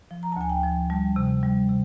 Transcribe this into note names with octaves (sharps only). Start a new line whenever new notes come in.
F3
A#5
A5
D2 G#5
G5
F3
G3 A5
C3
G3
C3